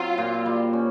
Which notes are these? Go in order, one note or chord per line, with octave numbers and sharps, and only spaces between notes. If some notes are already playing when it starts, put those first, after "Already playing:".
Already playing: F#3 C4 F4
A#2
G3
C#4